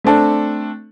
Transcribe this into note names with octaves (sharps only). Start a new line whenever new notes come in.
A3 C4 D4 A4